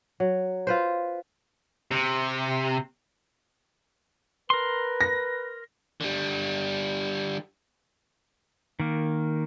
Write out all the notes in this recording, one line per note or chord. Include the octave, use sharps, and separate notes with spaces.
F#3
F4 B4 C5
C3
A#4 B4 C6
A#6
D3 G3
D#3 A#3